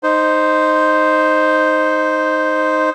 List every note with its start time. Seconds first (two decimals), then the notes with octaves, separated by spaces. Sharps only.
0.03 D#4 C5